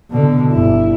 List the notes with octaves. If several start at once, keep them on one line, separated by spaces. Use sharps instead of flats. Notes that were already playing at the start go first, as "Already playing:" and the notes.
B2 D3
G1 E4